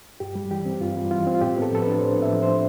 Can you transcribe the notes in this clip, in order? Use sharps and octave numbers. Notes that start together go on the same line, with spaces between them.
G2 G4
G3
E3 G4
C4
G2 F4
G3
E3 F4
C4
F4
A2 G4
B3 A4
F3 A4
D4 B4
A2 C5
B3
E5
F3
D4 C5